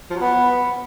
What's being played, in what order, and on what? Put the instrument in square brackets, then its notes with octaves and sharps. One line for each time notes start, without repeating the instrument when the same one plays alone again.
[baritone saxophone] F3
F#3
B3